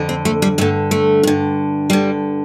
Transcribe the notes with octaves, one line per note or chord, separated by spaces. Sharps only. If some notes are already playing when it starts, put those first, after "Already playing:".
Already playing: F2 D3
C4
A3
G3
G2 D3 A3
A3
G2 D3
G2 D3 G3